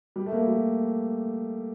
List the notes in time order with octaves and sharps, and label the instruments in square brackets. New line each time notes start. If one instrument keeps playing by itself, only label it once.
[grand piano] G3
A3
A#3
A3
G3